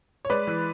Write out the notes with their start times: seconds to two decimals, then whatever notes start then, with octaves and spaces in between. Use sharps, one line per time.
0.25 C#5
0.30 G#3 B4 D5
0.47 E3